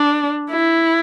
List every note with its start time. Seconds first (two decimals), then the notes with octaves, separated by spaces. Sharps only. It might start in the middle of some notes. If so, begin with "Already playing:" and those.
Already playing: D4
0.51 E4